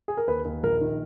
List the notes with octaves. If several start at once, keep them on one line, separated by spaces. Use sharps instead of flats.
G#4
A#4
D#2 B4
D#2
A#1 A#4
D#3